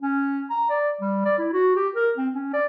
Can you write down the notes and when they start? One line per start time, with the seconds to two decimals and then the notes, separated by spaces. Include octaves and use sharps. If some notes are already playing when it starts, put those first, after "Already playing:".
0.03 C#4
0.50 A#5
0.70 D5
1.01 G3
1.25 D5
1.39 E4
1.53 F#4
1.76 G4
1.95 A#4
2.18 C4
2.35 C#4
2.53 D5